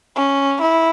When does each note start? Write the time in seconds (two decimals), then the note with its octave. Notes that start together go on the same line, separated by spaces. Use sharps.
0.15 C#4
0.61 E4